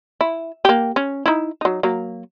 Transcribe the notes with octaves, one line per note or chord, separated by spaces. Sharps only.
E4
A#3 G4
C#4
D#4 E4
F#3 D#4
F#3 A#3